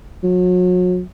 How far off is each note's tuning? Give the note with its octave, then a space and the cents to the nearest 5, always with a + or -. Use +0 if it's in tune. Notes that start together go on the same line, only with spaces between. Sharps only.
F#3 -35